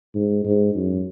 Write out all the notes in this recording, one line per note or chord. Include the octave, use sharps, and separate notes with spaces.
G#2
G#2
F#2